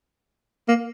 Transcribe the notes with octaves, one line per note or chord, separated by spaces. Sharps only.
A#3